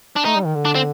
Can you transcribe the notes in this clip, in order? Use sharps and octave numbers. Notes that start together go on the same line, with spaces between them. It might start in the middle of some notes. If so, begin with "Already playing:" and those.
D4
A3 D#4
G3
D#3
D3
D4
C4